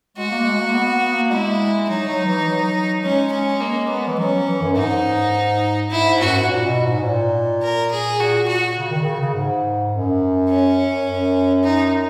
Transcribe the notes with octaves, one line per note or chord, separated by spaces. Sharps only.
G#3 F#4
A#3
G#3
A#3
B3
B3
A#3
G#3 E4
F#3 D#4
F#3
E3
F#3
G#3 C#4
C#4
A#3
B3
E3
F#3 C#4
F#3
E3
F#2
G#2 D#4
G#2 E4
F#2 F#4
G#2
A#2
B2
G#2
A#2
A#4
G#4
A#2 F#4
F#4
C#3
D#3
C#3
C#3
G#2
F#2
C#4
F#2
D#4